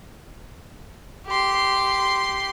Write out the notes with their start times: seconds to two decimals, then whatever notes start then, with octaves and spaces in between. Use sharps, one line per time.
1.27 G4 C6